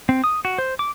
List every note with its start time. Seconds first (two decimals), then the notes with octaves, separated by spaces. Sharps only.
0.09 C4
0.24 D#6
0.45 F#4
0.58 C5
0.79 D6